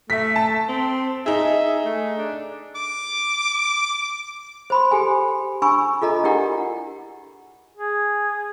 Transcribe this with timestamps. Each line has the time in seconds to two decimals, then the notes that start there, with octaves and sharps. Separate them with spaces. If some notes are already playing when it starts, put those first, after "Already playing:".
0.10 A3 E5 B6
0.36 A5
0.69 C4
1.26 D#4 G#4 E5
1.85 A3
2.18 D4
2.75 D6
4.70 C5 B5 C6
4.91 G4 A4 G#5
5.62 D4 G#5 B5 C#6 E6
6.02 F4 A4 D#5 A#5
6.24 D4 E4 G4 A#4 D5 F#5
7.75 G#4